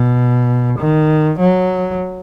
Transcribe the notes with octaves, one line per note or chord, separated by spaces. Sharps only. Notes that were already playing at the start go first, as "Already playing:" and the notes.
Already playing: B2
D#3
F#3